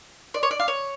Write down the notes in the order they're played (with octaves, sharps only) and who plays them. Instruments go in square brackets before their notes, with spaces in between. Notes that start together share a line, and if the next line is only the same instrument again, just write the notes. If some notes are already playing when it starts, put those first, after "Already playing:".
[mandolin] D5
C#5
D5
F5
C#5